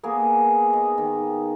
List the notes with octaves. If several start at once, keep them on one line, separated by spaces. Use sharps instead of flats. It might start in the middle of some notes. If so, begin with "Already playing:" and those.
A#3 B3 G#4 A#4
D#5
D#3